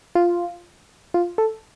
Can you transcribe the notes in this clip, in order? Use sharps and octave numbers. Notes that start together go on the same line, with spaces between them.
F4
F4
A4